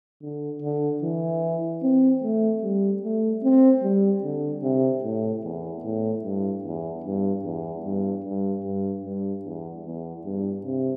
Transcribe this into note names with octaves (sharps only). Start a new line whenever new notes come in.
D3
D3
E3
C4
A3
G3
A3
C4
G3
D3
C3
A2
E2
A2
G2
E2
G2
E2
G2
G2
G2
G2
E2
E2
G2
C3